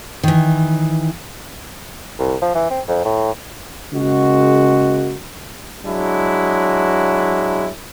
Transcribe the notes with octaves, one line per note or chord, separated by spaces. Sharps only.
D#3 E3
C2
F3
E3
C4
F2
A2
C#3 G#3 A#3 F#4
F#3 G#3 D4 E4